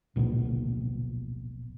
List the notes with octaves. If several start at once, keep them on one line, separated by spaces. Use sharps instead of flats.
D1 A#1 B2 B3